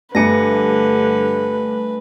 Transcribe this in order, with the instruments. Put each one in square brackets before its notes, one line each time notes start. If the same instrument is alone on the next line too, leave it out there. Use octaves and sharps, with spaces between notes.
[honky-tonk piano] G2 G3 C#7 [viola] D3 [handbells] A3 G#5 A#6 [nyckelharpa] B4